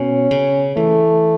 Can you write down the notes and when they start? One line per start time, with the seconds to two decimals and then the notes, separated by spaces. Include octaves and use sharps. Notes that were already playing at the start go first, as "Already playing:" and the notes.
Already playing: B2 C#4
0.31 C#3
0.77 E3 A3